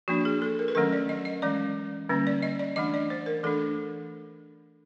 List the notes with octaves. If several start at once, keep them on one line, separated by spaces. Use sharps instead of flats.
F3 A#3 D4 F#4
G#4
A4
A#4
B4
D#3 F#3 A3 C#4 A#4
D5
D#5
D#5
E3 G#3 C#4 D5
D3 G3 A#3 C#4
D5
D#5
D5
E3 A3 D4 D#5
D5
C5
A#4
E3 A3 D4 A4